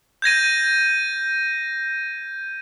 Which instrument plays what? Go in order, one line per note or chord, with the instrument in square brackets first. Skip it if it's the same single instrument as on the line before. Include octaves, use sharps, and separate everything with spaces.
[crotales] G6 G#6 A#6 D#7